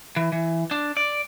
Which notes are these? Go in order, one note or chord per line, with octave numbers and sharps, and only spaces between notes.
E3
E3
D4
D5